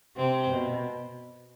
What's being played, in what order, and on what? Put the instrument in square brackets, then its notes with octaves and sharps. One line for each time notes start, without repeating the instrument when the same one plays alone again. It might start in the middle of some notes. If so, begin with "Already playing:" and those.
[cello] C3 [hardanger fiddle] C4
[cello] B2